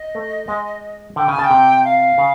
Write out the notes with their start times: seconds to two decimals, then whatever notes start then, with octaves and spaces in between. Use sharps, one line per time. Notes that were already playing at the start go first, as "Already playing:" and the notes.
Already playing: D#5
0.15 A3
0.48 G#3
1.16 D3 G5
1.28 C#3 G#5
1.39 C#3 A5
1.44 G5
1.51 C3
1.85 F5
2.18 C#3